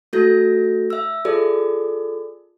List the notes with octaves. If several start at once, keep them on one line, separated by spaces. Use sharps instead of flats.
A3 F#4 A4 G6 A#6
E5 E6
F4 G#4 A4 D5